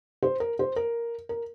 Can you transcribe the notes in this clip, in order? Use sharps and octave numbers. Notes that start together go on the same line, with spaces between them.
C5
A#4
C5
A#4
A#4